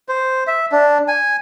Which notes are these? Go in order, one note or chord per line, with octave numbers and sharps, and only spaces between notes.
C5
E5
D4
G#5